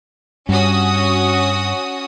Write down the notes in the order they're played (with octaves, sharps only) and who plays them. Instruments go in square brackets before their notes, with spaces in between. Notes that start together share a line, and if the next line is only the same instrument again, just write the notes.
[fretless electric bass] G2 [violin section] C#4 F#4 D#6